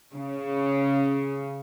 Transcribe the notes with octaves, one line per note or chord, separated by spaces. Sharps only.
C#3